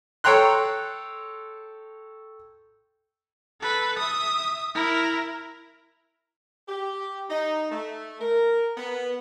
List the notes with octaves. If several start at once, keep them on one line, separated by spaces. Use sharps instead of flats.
A4 C#5 G5 A#5 C6 F#6
A4 B4
E5 D#6
E4 A#4
G4
D#4
A3
A#4
B3